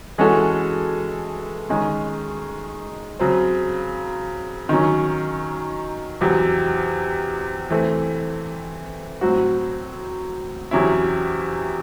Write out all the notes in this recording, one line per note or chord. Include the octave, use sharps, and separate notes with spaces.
E3 G#3 C#4 F#4 A4
D#3 G#3 C#4
C#3 F#3 C4
D#3 F#3 C#4
E2 C3 F#3
E3 A3 C4
A2 F#3 C4 F#4
E2 C3 F#3 C#4 E4